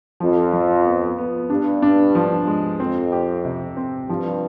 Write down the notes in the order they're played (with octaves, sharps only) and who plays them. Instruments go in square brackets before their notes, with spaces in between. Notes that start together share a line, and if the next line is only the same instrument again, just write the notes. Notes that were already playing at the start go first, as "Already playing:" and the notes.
[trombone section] F2 [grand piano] F3
[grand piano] F3
B3
B3
[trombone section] G2 [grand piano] D4
[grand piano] D4
F3
G#3
[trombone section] F2 [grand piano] C4
[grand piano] G4
C3
C4
[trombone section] G2 [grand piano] F3